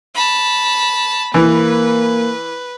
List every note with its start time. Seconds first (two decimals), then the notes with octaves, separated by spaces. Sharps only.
0.15 A5 B5
1.34 E3 A#3 B4